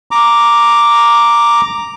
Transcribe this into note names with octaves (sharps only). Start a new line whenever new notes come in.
A#5 D6